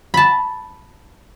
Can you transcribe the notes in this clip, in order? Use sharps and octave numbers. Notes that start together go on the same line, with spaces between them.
A5 B5